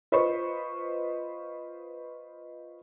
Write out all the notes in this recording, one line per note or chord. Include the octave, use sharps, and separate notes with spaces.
F4 B4 C5 D#5 B5 C#6